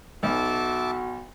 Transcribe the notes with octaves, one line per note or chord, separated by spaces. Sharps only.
B1 F#4 E5 A5 D6